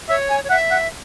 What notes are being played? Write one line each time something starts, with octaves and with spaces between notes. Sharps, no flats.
C#5 E5
G#5
C#5
E5 F#5
F#5